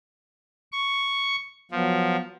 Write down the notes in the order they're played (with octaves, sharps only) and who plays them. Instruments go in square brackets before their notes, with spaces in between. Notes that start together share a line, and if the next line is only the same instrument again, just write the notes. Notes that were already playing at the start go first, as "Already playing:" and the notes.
[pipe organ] C#6
[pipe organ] F3 [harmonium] F#3 B3